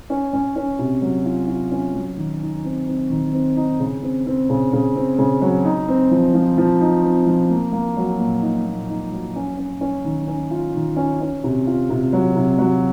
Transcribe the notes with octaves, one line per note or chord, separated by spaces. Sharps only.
C#4
C#4
C#4
C3
F#3
F4
F4
C#4
F#3
D#3
D#4
C4
C4
D#3
C4
D#4
C#3
C4
C4
C#3
C#3
C4
C#3
F#3
D#4
C4
F3
F3
F3
D#4
C4
F3
A#3
A#3
F#3
A#2
D#4
A#2
D#4
F#3
C#4
C#4
C#4
D#3
C#4
F4
D#3
C#4
C#4
C3
F4
C3
F#3
C3
F#3